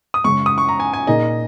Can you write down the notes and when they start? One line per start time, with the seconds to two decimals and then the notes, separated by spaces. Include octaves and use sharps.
0.14 D#6
0.24 F#2 C#3 G#3 C#6
0.46 D#6
0.58 C#6
0.69 A#5
0.80 G#5
0.93 G#5
1.07 A#2 A#3 D#4 G#4 D#5